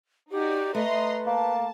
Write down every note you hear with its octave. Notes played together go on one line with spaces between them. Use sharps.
D#4 F#4 G4 D5
A3 B4 D#5 A#5 C6
A#3 A5